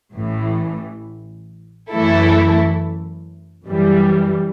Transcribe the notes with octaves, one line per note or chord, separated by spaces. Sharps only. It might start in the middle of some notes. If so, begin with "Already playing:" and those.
A1 A2 E3
F#2 E3 A3 E4 A4
F#2 E3 G3